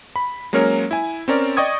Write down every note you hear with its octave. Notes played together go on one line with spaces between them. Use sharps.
B5
F#3 G#3 A#3 C#4 A#4 C#5
E4 G#5
C4 C#4 A#4 D5
D5 D#5 G5 C#6 D#6 G#6